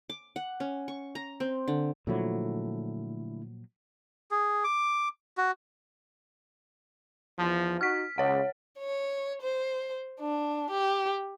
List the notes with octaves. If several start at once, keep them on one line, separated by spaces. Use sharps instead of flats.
D6
F#5
C#4
C#6
A#5
C4
D3
A#2 D3 F3 F#3 A3 E4
G#4
D6
F#4
E2 F3
D#4 F#4 F6 B6
C#2 C#5 F#5
C#5
C5
D4
G4